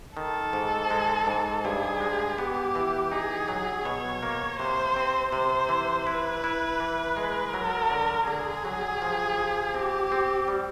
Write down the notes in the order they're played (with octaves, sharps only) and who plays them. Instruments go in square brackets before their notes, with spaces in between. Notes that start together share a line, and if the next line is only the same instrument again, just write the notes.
[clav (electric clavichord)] D#3 [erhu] A4
[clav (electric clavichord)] G#2
G#3
G#2
[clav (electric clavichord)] G2 [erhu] G#4
[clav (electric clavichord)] G#3
[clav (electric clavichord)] B3 [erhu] G4
[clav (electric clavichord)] E3
[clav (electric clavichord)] D#4 [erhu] G#4
[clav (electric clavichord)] F#3
[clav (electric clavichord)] B2 [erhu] C#5
[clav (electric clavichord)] A#3
[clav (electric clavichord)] C3 [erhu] C5
[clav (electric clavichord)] C4
[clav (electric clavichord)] C3 [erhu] C5
[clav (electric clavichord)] E3
[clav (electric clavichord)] E4 [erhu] B4
[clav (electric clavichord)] E4
E3
G#3
[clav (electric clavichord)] F#3 [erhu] A#4
[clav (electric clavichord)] D3
[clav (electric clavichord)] D3 [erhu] G#4
[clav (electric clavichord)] F#3
F3
F3
[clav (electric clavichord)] C4 [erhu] G4
[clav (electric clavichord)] C4
G3